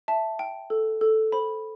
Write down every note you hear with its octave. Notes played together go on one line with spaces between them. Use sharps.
E5 A5
G5
A4
A4
C5 B5